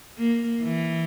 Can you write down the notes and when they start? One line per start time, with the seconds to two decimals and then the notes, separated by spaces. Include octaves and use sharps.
0.18 A#3
0.63 E3